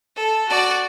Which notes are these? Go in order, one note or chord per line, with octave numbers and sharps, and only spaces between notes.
A4
F#4 D5